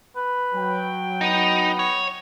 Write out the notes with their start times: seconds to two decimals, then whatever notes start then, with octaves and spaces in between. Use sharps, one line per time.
0.16 B4
0.55 F#3 G5
1.21 B3 D#4
1.79 C#5